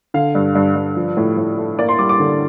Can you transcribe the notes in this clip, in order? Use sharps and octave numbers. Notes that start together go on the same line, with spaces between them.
D3 F5
G2
G2
G2
F3
A2
A2
A3
A#3 D5
C6
G3 D6
D6
D3